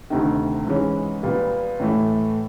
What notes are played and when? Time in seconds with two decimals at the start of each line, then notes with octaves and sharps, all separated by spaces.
0.10 D2 C3 D#3
0.67 G#2 E3 G#3 C#4
1.23 A#2 G3 B3
1.80 A2 E3 A3